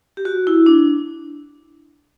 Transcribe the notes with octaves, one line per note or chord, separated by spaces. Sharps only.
G4
F#4
E4
D4